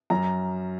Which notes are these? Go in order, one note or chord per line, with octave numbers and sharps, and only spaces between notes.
F#2 A#5